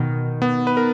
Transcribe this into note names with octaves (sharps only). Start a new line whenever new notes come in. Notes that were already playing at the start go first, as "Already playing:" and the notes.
Already playing: B2 D#3
B3
B4
A#4